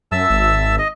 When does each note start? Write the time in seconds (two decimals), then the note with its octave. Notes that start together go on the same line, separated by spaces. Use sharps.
0.12 F#2 E5 A5 E6
0.30 G#1
0.78 D#5